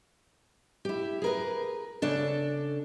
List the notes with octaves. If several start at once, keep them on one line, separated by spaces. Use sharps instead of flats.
E4 G4
G#4 A#4 B4
C#3 D4 A4